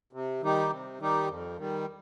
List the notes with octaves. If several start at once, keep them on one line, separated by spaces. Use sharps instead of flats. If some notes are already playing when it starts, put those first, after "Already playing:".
C3
D#3 G3 D#4 G4
C3
D#3 G3 D#4 G4
F2
D#3 G3